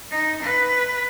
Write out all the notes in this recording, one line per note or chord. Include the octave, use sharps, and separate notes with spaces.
D#4
B4